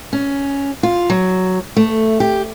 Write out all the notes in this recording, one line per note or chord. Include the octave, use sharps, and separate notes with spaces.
C#4
F4
F#3
A3
G4